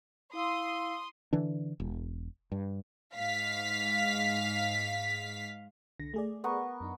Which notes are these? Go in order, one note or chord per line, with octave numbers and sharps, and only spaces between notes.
E4 F5 C6 D#6 E6
D3 E3 D4
E1
G2
G#2 F5 B6
C2 D3 A#6
A3 G#4 D5
B3 A#4 C#6
F#2 D4 D#4